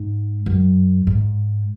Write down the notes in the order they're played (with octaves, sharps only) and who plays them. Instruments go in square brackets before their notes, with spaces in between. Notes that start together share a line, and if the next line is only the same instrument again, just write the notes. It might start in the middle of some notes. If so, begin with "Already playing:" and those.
Already playing: [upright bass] G#2
F#2
G#2